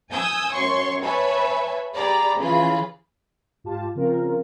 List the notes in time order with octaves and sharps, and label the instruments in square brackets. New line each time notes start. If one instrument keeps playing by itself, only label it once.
[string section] G#5 D#6 E6 G6
F#2 C#5 C6 C#6
B4 C#5 E5 G#5 A5 B5
G4 G#4 D5 A#5 B5
C#3 E3 F4 G#4 B5
[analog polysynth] G#2 F4 G4 A5
C#3 F3 C4 F4 A#4